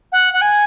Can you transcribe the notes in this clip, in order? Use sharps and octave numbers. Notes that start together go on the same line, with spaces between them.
F#5
F#5
G#5